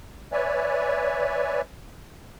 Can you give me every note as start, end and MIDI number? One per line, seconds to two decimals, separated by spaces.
0.32 1.61 71
0.32 1.61 73
0.32 1.61 74
0.32 1.61 76
0.32 1.61 80